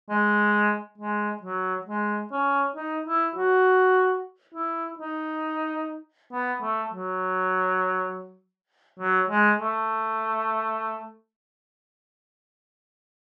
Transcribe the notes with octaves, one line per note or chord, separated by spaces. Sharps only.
G#3
G#3
F#3
G#3
C#4
D#4
E4
F#4
E4
D#4
B3
A3
F#3
F#3
G#3
A3